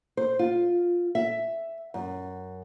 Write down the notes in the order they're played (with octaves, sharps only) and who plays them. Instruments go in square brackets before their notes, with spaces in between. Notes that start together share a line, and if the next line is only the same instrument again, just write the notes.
[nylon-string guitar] C5
F4
E5
F#2